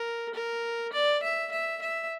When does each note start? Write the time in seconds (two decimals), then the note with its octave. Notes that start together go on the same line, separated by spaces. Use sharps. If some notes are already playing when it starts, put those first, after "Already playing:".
Already playing: A#4
0.34 A#4
0.93 D5
1.22 E5
1.52 E5
1.82 E5